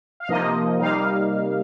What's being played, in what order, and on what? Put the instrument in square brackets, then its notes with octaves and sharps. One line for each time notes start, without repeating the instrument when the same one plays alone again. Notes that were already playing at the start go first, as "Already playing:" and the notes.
[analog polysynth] F5
C3 F3 A#3 D#4 D#5
C3 G3 A#3 D#4 F5